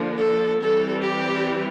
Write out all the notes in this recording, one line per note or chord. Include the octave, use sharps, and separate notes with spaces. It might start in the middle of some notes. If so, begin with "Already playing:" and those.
Already playing: D3 F3 A#3 D4
A4
E3 G3 C4 A4
G4